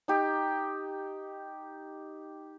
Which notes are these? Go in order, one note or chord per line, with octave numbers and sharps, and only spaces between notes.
D#4 G4